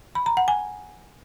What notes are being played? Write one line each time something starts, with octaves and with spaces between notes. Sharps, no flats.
B5
A#5
F#5
G#5